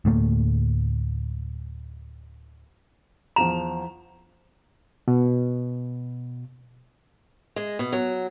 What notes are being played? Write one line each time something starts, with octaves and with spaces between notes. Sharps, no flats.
D2 A2 A3 A#3
E2 F3 A#5 F7
B2
G#3
B2
F#3